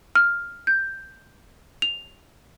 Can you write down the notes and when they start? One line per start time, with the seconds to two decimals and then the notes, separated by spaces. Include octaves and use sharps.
0.15 F6
0.67 G6
1.82 F7